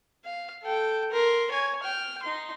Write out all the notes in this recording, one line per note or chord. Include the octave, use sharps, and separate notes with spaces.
F5
A4 G5
A#4 C6
C#5 G#5
G5 F6
D#4 C6